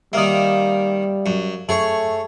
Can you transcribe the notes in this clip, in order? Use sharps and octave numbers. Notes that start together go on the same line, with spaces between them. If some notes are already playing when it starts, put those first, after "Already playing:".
D#3 G3 A#3 E5 F5 D#6
F#2
F#2 A3 G#4 C#5